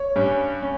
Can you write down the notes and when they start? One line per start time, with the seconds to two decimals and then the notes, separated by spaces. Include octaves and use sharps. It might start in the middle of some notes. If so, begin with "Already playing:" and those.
Already playing: C#5
0.16 G2 G3 C#4
0.62 C#4